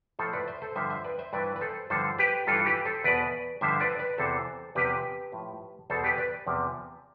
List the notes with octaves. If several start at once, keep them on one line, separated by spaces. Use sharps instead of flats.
A2 F3 A4 C5
B4 D5
C5 E5
A4 C5
G2 D3 F3 C5 E5
C5 E5
B4 D5
C5 E5
G2 E3 B4 D5
B4
A4 C5
G2 D3 F3 A4 C5
G4 B4
G2 E3 F4 A4
G4 B4
A4 C5
E2 B2 B4 D5
G2 D3 F3 C5 E5
B4 D5
B4 D5
E2 C3 E3 A4 C5
E2 C3 F3 G4 B4
A2 F3
E2 B2 A4 C5
G4 B4
B4 D5
E2 C3 F3